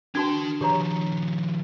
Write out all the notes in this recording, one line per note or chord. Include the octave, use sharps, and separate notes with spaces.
D4 F#4 A#4 G5 A5
D#3 F3 G4 C#5 A#5